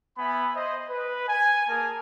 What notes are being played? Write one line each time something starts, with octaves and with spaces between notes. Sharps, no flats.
B3 E5 G#5 B5
C5 D#5
B4
G#5
A#3 G#4 A#4 G#5 A5